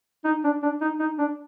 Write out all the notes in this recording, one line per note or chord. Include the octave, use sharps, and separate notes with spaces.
D#4
D4
D4
D#4
D#4
D4